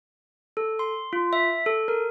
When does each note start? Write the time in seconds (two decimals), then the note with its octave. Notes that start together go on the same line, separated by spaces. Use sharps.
0.57 A4
0.79 C6
1.13 F4
1.33 E5
1.66 A4
1.88 A#4